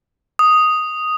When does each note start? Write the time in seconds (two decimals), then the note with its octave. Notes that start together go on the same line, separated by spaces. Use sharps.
0.39 D#6